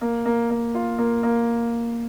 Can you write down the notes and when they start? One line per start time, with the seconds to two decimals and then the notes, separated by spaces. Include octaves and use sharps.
0.01 A#3
0.25 A#3
0.50 A#3
0.75 F4
0.98 A#3
1.23 A#3